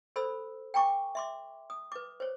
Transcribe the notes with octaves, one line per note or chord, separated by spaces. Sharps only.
A4 C5 B5 E6
G5 G#5 A#5 C#6 D6
E5 C6 D6
D#6
B4 D6
C5 C#5